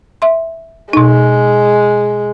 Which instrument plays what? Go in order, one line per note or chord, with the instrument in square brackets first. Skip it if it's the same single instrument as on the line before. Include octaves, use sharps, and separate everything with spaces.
[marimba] E5 C6
[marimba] B2 D#4 [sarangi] G#3